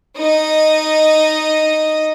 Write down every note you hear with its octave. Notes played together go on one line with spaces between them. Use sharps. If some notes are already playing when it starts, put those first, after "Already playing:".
D#4 D#5